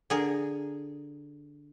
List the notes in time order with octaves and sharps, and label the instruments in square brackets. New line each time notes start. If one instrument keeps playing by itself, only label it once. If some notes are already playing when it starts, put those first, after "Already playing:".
[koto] D3 G#4 A#4